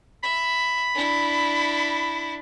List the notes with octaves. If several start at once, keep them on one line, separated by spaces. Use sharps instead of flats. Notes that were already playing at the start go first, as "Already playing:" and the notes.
E5 B5
D4 E4